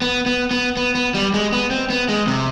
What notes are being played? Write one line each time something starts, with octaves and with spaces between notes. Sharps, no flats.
B3
B3
B3
B3
B3
G3
G#3
B3
C4
B3
G#3
C3